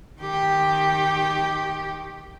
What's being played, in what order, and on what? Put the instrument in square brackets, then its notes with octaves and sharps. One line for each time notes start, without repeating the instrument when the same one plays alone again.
[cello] D#3 G4